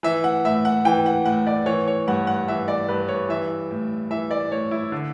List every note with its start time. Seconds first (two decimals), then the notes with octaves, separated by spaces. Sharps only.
0.03 E3 E5
0.24 F#5
0.45 A2 E5
0.65 F#5
0.85 E3 G5
1.06 F#5
1.25 A2 F#5
1.47 D5
1.66 E3 C#5
1.88 C#5
2.08 G2 F#5
2.27 F#5
2.48 E3 E5
2.68 D5
2.88 G2 B4
3.08 C#5
3.29 E3 E5
3.71 A2
4.10 E3 E5
4.31 D5
4.51 A2 C#5
4.71 E4
4.92 D3